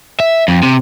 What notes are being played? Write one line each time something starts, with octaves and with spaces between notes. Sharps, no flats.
E5
F2
C3